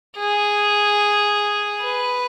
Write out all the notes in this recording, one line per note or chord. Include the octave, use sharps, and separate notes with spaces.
G#4
B4